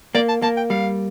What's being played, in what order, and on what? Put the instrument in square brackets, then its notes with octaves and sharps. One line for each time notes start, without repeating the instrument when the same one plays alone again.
[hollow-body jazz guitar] A#3 [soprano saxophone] D5
[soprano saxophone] A5
[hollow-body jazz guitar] A#3 [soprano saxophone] A5
[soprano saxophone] G5
[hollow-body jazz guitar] G3 [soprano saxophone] F5